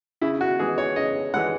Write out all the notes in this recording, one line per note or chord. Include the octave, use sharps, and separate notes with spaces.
C#3 E4
F#4
E3 G#3 G#4
C#5
C#3 D#5
E3 G#3 F#5